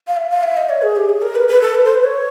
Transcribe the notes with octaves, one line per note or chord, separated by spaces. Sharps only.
F5
E5
F5
E5
D#5
C#5
G#4
G4
G#4
A#4
B4
B4
A4
B4
C5
B4
C#5